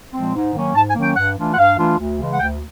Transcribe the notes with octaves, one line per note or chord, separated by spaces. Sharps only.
A#2 F3 G#3 C4
G#2
D#3 F#3 A#3 C#4
G#2 A5
G#5
D#3 F#3 A#3 C#4
G5
G2 F#5
E3 A3 D4 F4
F#5
G2 F5
E3 A3 D4 F4
D2
C#3 E3 G#3
F#5
D2 G5